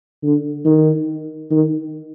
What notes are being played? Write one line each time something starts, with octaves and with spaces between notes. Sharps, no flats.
D3
D#3
D#3